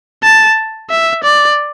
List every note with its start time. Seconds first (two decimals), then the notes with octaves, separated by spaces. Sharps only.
0.24 A5
0.90 E5
1.25 D5